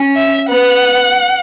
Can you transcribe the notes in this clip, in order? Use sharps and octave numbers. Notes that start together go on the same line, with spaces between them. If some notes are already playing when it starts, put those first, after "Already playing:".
Already playing: C#4
E5
B3 F#5